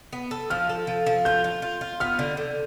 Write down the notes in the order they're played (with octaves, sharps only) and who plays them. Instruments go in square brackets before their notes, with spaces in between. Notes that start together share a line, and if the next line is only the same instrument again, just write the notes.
[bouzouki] B3
A4
[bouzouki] F3 [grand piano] F6
[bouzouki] A4
F3
F3
[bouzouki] F4 [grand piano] G6
[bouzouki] F4
F4
F4
[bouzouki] B3 [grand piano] F6
[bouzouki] D3
D3